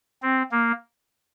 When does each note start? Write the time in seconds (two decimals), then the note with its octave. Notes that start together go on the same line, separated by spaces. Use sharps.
0.22 C4
0.52 A#3